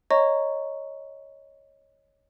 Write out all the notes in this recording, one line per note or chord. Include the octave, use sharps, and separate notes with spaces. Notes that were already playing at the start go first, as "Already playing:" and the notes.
C#5 D#5 A#5 C#6